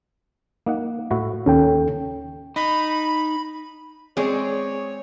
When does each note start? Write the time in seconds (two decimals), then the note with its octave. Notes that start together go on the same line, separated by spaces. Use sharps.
0.66 A#3 D#4 F#5
1.11 A2 E4 F#4
1.46 D#2 C#4 A4 G5
2.56 D#4 B5
4.17 G#3 C4 G#4 C#5 D5